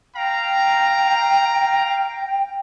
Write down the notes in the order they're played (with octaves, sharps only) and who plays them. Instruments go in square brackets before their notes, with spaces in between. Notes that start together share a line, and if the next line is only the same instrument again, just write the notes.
[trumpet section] F5 A#5 [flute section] G5